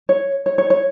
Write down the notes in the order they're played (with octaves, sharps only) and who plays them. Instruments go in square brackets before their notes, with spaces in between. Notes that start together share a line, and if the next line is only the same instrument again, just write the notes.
[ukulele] C#5
C#5
C#5
C#5